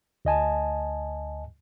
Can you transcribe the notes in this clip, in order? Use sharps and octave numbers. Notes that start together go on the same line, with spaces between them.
D2 D#5 G#5 A5